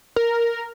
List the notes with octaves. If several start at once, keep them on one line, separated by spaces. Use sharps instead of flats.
A#4